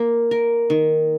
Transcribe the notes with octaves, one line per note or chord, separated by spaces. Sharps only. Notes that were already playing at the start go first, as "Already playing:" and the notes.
Already playing: A#3 A#4
A#4
D#3